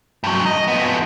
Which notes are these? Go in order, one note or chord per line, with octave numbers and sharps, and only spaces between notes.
G2 F#3
D#5
F2 B3